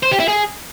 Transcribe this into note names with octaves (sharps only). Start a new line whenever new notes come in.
C5
G4
E4
G#4